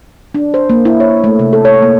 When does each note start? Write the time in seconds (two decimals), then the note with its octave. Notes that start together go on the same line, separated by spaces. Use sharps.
0.35 D4
0.54 C5
0.70 A#3
0.85 E4
1.00 C#5
1.24 A3
1.39 C3
1.53 A4
1.65 C#5
1.82 A#3